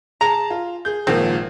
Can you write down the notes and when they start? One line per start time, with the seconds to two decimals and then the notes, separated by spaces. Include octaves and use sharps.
0.21 G#4 A5 A#5
0.51 F4
0.85 G#4 G6
1.07 G#1 A#2 F3 C4